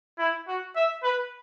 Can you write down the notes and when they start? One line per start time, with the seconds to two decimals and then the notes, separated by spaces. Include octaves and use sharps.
0.19 E4
0.48 F#4
0.76 E5
1.03 B4